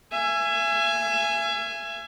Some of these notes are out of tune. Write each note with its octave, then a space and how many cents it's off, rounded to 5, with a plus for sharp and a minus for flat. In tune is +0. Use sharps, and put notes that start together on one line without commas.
E5 +35 G#5 +0